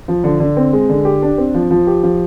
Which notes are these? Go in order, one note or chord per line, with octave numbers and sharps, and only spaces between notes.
F3
D3
D3
C4
G#3
D3
G4
D4
C4
F3
F3
G4
F3